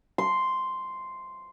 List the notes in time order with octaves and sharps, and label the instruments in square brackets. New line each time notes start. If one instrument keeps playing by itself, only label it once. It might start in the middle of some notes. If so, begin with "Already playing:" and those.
[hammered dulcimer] C6